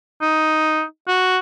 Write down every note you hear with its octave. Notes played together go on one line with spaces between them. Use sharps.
D#4
F#4